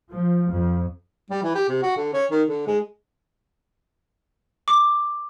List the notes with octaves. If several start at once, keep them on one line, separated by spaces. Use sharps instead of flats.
F3
F2
G3
E3
G4
C3
F#4
D3
C#4
D#3
D3
G#3
D6